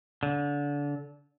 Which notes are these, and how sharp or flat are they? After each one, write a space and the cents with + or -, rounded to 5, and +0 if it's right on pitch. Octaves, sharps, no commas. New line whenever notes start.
D3 -25